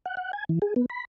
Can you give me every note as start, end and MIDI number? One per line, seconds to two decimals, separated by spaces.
0.06 0.15 78
0.17 0.32 78
0.33 0.45 80
0.49 0.59 52
0.62 0.74 68
0.76 0.86 59
0.90 1.05 83